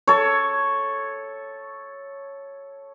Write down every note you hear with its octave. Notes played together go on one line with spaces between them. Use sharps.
A4 C#5